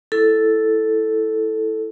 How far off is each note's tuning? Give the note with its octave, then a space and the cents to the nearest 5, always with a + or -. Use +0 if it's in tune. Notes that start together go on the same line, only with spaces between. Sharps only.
E4 +0 A4 +0